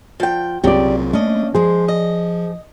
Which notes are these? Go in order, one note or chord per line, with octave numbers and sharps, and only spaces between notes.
F3 G5
C2 A#2 C#3 F#3 C4 G4 D5
A3 A#3 C#4 D4 D#5
F3 G#3 G#4 C5
D#5